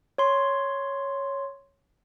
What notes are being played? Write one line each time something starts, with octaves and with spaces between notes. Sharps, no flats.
C#5 C6